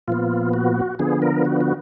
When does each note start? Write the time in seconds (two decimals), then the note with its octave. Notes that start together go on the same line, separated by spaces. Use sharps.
0.08 A#2 F3 B3 F4
0.54 F#4
0.99 D3 F3 B3 G#4
1.22 A#4
1.45 F#4
1.61 F#4